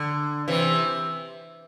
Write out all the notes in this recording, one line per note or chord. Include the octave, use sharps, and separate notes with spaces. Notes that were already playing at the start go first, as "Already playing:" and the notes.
Already playing: D3
C3 E3